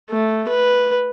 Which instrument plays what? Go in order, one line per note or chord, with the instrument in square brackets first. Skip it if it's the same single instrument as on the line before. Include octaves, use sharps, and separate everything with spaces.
[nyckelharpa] A3
B4